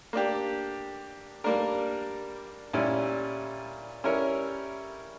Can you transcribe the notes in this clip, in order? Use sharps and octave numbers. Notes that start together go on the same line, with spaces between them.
A#3 D4 G4
G3 A#3 D4 A#4
A#2 G3 C#4 E4
G3 C#4 E4 A#4 C#5